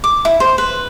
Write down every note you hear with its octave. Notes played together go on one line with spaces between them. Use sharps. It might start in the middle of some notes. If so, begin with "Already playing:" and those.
D6
E4
C5
B4